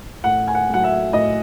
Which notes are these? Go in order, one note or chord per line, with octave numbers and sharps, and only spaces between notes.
A2 F#5
G#5
F#5
F#3 A3 F#5
E5
A2 D#5